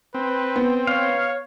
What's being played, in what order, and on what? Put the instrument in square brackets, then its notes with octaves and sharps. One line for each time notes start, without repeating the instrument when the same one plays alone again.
[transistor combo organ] C4 [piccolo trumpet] B4
[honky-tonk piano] B3
[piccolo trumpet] C#5 [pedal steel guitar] F5